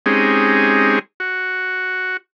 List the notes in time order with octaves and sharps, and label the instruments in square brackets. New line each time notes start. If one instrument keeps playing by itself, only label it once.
[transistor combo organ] G#3 C4 C#4 D#4 G4 G#4
F#4